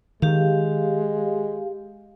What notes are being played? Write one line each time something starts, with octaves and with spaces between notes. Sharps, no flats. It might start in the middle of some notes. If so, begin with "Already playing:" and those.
D#3 G#3 G4 F5